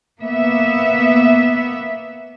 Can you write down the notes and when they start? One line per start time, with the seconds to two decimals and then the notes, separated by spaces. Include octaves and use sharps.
0.20 A#3 B3 E5